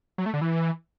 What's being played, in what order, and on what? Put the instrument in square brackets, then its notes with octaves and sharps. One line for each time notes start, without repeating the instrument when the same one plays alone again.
[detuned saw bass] F#3
A3
D3
E3